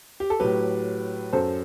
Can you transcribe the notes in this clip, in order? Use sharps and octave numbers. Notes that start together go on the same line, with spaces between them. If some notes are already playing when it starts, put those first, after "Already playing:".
G4
A4
A2 F#3 G4 B4
F#2 F#3 A4 C5